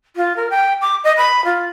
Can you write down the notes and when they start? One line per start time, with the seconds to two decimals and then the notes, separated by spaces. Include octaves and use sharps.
0.16 F4
0.36 A#4
0.50 G5
0.81 D6
1.04 D#5
1.17 B5
1.45 F4